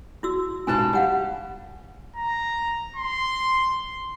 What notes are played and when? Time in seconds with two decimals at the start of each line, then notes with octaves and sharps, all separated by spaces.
0.23 E4 F#4 E6
0.67 G#2 B2 G#5 A5
0.93 G3 F5 F#5 G#5
2.16 A#5
2.96 C6